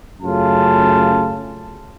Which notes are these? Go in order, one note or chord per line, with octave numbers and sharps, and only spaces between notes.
F#2 C#3 A3 F4 A5